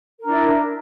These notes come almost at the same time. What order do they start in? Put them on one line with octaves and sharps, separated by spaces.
A#4 D4 E4